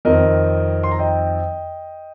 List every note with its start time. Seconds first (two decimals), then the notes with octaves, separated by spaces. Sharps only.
0.05 F2 D#3 C4 A#4 D#5
0.83 C6
0.91 A#5
0.99 D#5 G5